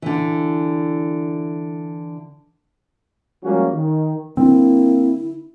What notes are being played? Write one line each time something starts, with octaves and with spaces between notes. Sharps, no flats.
D3 E3
F3 G3 G#3 A#3 C#4 F#4
D#3
D3 F#3 A#3 C4 D4 E4